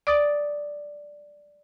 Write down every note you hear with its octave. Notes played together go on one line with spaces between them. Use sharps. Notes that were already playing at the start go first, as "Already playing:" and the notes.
D5 D6 D#6 A6